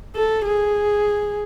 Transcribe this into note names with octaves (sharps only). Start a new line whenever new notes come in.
A4
G#4